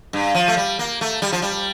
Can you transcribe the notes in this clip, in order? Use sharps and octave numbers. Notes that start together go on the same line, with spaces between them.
G2
F3
A3
G3
A#3
A3
G3
F3
G3